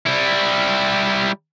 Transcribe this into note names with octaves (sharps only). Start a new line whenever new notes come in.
G3 E4